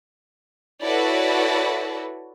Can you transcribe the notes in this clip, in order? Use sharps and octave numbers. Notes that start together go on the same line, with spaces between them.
E4 F#4 A4 B4 C#5 D5